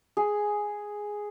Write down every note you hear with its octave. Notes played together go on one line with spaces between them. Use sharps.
G#4